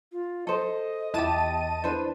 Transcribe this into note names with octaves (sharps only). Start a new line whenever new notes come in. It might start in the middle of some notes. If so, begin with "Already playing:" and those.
F4
A4 C5 D#5
E2 E4 G4 A5 D#7
D4 E4 B4 C5